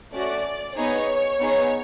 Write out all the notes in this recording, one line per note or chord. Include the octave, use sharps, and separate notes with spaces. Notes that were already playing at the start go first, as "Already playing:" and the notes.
A3 C#4 F#4 D5
B3 D#4 G#4 C#5
B3 D#4 G#4